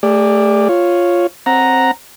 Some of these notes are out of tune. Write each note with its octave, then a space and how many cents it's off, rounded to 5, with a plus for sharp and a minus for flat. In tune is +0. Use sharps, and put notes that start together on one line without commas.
A3 +0 G4 +45 D5 +0
F4 +0 C#5 -5
C4 +10 F#5 +0 A#5 +0